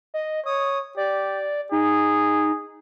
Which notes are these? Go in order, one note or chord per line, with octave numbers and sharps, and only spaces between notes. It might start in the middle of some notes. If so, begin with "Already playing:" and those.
D#5
C#5 D#6
G4 D5
D#4 G#4